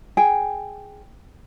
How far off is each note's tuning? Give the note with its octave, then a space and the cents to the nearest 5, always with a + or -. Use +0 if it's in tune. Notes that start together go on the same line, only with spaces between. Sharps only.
G#4 +0 G5 +0